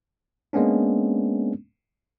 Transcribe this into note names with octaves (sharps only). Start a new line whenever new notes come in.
G#3 A#3 B3 C#4 D4